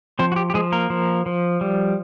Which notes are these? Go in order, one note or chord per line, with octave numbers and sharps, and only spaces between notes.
F3 C4 C5
F#4
G4
G4
F3 G#3 G#4
A#3 A#4
F3
F3
G3